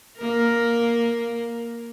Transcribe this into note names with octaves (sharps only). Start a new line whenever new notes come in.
A#3 A#4